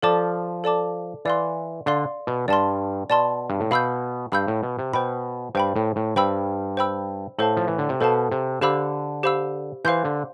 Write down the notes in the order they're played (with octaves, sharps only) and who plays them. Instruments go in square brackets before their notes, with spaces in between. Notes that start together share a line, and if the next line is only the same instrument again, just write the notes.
[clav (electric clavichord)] F3 [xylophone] A4 D5 A5 D6
[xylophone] A4 D5 A5 D6
[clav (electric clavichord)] E3 [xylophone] D5 F5 C6
[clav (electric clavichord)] D3 [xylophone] D5 F5 C6
[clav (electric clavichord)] B2
[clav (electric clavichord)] G2 [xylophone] D5 A5 C6
[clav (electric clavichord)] B2 [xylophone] D5 A5 C6
[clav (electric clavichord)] G2
A2
[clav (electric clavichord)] B2 [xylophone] F5 B5 E6 G6
[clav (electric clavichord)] G2 [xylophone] F5 B5 E6 G6
[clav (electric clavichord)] A2
B2
C3
[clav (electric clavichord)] B2 [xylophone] C5 G5 B5
[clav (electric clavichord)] G2 [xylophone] C5 G5 B5
[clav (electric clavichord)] A2
A2
[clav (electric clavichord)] G2 [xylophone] C5 G5 B5 E6
[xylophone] C5 G5 B5 E6
[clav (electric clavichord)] A2 [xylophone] A4 C5 F5 A5
[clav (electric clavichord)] F3
E3
D3
C3
[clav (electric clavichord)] B2 [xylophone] A4 C5 F5 A5
[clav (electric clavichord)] C3
[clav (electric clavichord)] D3 [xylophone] G4 C5 F5 B5 E6
[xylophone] G4 C5 F5 B5 E6
[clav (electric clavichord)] E3 [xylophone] C5 F5 C6 G6
[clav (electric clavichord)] D3